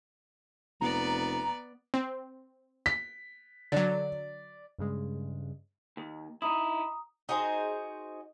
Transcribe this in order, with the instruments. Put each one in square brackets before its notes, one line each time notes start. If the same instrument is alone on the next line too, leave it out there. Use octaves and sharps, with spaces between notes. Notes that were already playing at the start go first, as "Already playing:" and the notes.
[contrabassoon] F1 [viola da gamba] B3 D5 [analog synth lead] A#5
[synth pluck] C4
[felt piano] B6
[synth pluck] D3 F#3 [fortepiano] D5
[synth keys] G2 C#3 G#3
[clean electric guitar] D#2
[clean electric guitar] D#4 E4 [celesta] A#5 D#6
[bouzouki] D#4 F#4 G#4 C5